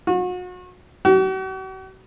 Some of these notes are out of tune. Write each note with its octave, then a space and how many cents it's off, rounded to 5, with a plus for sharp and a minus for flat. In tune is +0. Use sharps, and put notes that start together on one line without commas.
F#4 -35
F#4 +45